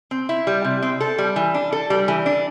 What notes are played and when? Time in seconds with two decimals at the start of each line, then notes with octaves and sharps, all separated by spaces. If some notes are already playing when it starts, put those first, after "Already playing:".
0.11 C4
0.29 E4
0.47 G3
0.64 C3
0.82 C4
1.00 A4
1.18 G3
1.36 E3
1.54 D4
1.72 A4
1.90 G3
2.08 E3
2.26 D4